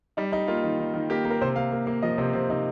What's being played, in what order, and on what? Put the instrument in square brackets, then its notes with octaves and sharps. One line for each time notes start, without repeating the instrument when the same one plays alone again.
[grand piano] G3 D#4
G3 D#4
A#3 F4
D#3
D#3
D#3
A#3 G4
A#3
A#4
C3 C5
A#3 F5
A#3
A#3
F3 D#5
C3 C5
C3 C4
C3 D#4